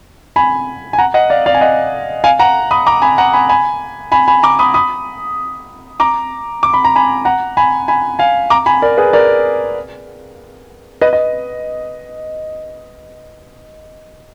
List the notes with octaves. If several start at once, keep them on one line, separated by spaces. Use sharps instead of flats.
G#5 B5
G#5
F#5 A#5
D#5 F#5
D5 F5
D5 F5
G#5
D#5 F#5
F5 G#5
F#5 A#5
B5 D#6
A#5 D6
G#5 B5
F#5 A#5
G#5 B5
G#5 B5
G#5 B5
G#5 B5
A#5 D6
B5 D#6
B5 D#6
A#5 D6
D6
B5
A#5
G#5 B5
F#5 A#5
G#5 B5
G#5 B5
F5 G#5
A#5 D6
G#5 B5
A#4 D5
G#4 B4
A#4 D5
B4 D#5
D#5